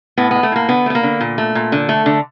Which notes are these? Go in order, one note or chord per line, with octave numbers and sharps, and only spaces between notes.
A2 B3
G#3 B3
A3
A2 A#3
D3 B3
A3
B3
A#3
D3
A#2
A3
A#2
D3
A3
D3